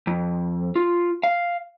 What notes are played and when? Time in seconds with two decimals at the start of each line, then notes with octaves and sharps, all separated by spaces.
0.07 F2
0.76 F4
1.23 F5